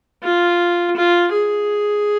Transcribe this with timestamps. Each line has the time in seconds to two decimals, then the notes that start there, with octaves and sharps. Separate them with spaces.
0.23 F4
0.97 F4
1.32 G#4